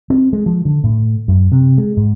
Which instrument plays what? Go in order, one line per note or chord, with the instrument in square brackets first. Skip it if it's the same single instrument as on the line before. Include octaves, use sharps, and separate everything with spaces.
[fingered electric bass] C4
G#3
F3
D3
A2
F#2
C3
G#3
G#2